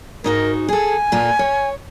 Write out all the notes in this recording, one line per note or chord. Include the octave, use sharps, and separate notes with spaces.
G#2 D#4 F#4 A#4
G#4 A4 G#5
A#2 F4 A4
C#5